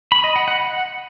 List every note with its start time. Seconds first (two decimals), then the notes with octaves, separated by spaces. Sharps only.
0.12 B5
0.24 D#5
0.36 F#5
0.48 F#5
0.60 F#5